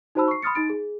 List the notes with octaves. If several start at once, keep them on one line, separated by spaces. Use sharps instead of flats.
D#4 F#4 C5 A5 B5 E6
C#6 C7
B5 C6 D#6 F6 A6 C#7
D#4 A6 D7
G#4